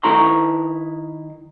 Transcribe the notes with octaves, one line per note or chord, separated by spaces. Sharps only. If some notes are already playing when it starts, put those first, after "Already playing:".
D#3 E4 A#5 C6